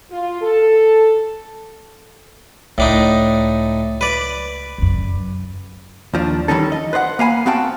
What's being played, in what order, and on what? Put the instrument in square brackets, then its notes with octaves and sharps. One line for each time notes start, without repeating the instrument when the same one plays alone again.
[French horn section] F4
A4
[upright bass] C#2 [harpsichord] A2 D4 D#4
[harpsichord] B4 D5
[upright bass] F#2 C#3
[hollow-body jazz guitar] D#2 F3 D4
D#3 E3 G3 C#4 D#4 A4
D#5
B4 C5 D5 F#5
A#3 F5 G#5 B5
B3 C4 F#4 F5 G5 A5